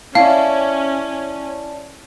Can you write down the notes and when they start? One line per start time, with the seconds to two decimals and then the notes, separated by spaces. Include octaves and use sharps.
0.15 C#4 E4 D5 F5 A5